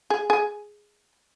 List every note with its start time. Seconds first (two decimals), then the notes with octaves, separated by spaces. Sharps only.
0.10 G#4
0.30 G#4